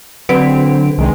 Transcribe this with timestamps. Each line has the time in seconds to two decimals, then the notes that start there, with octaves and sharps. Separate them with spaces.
0.29 D3 F#3 C4 B4 D7
0.98 C2 D#3 G#3